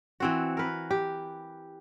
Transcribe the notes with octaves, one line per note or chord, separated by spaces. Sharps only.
E3 C4 F#4
A#4 B4
G4